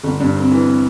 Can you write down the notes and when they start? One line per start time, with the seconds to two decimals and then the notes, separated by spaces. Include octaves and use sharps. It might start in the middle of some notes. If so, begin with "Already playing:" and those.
0.04 G1
0.20 G2
0.36 C4
0.51 E3